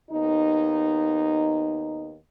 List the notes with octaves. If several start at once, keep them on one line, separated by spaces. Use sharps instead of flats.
D#2 B3 D#4